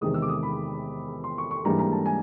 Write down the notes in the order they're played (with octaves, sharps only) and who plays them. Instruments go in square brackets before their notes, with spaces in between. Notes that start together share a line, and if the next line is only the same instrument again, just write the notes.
[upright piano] E2 C3 D#3 G#3 D#6
E6
D6
D#6
B5
C6
C#6
C#6
G#2 E3 G3 A#3 D4 A#5
A#5
A5
G#5